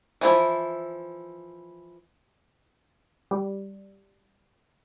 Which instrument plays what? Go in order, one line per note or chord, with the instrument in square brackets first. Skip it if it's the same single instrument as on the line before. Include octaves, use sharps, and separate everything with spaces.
[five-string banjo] E3 F3 E4
[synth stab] G3